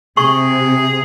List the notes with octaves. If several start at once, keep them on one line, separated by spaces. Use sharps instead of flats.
C3 G#4 C#6